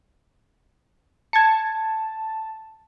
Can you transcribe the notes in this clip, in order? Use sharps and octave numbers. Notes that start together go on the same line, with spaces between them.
A5 G#6 C#7